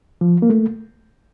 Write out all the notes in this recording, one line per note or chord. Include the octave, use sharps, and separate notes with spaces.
F3
A#3
A3